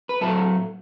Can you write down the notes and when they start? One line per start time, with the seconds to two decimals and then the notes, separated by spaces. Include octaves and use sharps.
0.09 B4
0.21 A2 F#3 A3 A4